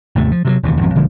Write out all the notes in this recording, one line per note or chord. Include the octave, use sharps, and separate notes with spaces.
G#1 D#2 C3 A3
F3
C3 E3 F#3
E1 D#2 C#3
G#1 F2 C3 F3
B1 D3 F3 G#3